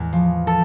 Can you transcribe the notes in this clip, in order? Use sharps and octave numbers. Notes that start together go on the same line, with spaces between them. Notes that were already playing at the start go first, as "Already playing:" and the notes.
Already playing: E2 A2 G#3
F3
A4